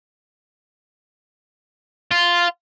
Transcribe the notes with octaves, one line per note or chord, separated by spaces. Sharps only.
F4